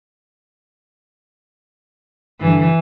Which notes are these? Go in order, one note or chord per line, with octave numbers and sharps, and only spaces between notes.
G2 D3 E3